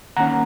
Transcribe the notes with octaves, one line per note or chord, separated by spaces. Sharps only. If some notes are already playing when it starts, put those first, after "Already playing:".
D#3 A#3 C#4 F#5 A#5